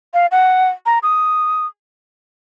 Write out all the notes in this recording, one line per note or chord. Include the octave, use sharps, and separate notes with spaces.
F5
F#5
A#5
D#6